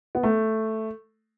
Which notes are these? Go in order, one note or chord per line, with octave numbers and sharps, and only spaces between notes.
B3
A3